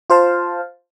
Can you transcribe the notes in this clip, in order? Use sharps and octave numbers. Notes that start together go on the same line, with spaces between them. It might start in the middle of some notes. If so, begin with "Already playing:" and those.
F4 C5 F5 A5